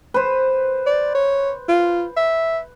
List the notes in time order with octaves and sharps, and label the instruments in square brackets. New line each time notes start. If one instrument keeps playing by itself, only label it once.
[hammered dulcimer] B4 C5
[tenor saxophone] D5
C#5
F4
E5